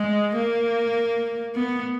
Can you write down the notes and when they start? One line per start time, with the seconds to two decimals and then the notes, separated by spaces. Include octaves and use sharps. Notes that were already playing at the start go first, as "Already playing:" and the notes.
Already playing: G#3
0.35 A#3
1.55 B3